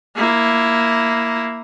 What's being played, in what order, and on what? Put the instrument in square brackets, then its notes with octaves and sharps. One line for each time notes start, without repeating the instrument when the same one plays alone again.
[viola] A#3 E4